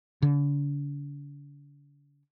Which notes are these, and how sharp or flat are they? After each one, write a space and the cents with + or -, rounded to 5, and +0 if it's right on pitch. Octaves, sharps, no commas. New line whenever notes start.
D3 -40